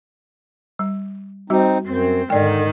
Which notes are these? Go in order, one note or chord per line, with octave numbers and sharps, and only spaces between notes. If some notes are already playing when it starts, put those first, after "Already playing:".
G3
G3 C4 D#4 F#4
F#2 C4
G#2 D3 D#3 D5 G5